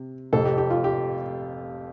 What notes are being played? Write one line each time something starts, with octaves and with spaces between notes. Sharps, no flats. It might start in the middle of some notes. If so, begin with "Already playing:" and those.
Already playing: C3
F1 F2 C3 A4
G4
G4
F4
G4